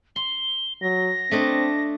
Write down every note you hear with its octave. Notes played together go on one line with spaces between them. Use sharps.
C6 G7
F#3 A#6
A3 C4 D4 D#5